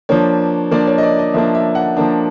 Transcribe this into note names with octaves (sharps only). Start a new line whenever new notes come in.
F3 A#3 D4 C#5
F3 A#3 D4 D5
C#5
D#5
D5
D#5
F3 A#3 D4 E5
E5
F#5
F3 A#3 D4